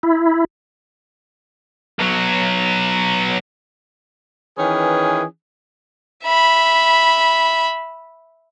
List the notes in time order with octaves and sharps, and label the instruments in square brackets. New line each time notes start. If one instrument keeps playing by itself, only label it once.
[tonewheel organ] E4
[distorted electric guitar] B1 F#3
[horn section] D#3 E3 C#4 G#4 B4
[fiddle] E5 B5